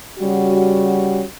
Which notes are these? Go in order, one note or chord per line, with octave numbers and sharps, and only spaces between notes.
C#3 G3 C#4 F#4